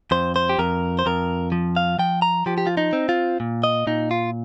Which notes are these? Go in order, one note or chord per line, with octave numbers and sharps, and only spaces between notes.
F2 C5
C5
G4
F2 A#4
C5
F2 A#4
F3
F5
F3 G5
A#5
F3 G4
G4
F4
D#4
C4
F4
A#2
D#5
A#2 D#4
F4